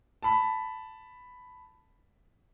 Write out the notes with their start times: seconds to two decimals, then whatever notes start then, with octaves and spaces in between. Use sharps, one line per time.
0.23 A5 B5